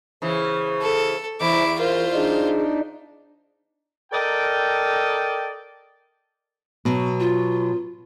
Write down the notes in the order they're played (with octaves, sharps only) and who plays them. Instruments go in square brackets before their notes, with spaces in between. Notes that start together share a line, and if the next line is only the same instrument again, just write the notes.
[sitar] C#3 E3 [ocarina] C5
[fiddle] A4
[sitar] E2 [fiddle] E4 D6 [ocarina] C5
[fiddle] F4 C5 [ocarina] A#4
[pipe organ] D4 D#4 [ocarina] G#4
[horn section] A4 A#4 D5 D#5 G5
[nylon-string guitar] B2 F#3
[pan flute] F4